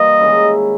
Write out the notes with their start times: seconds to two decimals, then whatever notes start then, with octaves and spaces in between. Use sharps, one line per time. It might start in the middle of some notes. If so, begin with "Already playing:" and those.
Already playing: E3 G3 A#3 D#5
0.20 D#3 G#3 C#4 E4